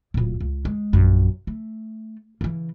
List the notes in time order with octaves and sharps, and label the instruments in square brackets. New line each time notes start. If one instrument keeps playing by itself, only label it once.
[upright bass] D1 A#2
C#2
G#3
A#1 F#2
A3
C#3 E3